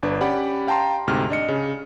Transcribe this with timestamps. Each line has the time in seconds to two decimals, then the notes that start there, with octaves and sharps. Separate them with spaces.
0.03 G1 D4 B4
0.21 C#4 G4 D5 F#5 B5
0.67 F5 G5 A5 A#5 C6
1.07 D2 G#2 C3 F6
1.30 D4 D#5 C#7
1.48 C#3